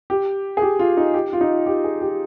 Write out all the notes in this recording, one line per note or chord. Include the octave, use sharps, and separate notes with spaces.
G4
G#4
G4
F4
D#4
G4
F4
D#4
G4
G#4
G4